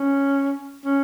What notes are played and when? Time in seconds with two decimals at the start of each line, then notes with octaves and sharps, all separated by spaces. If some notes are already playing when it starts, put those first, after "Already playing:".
Already playing: C#4
0.85 C#4